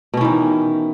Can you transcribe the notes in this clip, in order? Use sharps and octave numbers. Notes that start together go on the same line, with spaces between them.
B2 D#3 E3 C#4